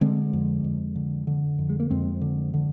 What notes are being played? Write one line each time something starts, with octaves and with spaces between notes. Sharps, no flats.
D3 G#3 C4
F2
F2
D3
D3
F2
G#3
A#3
F2 G#3 C4
D3
D3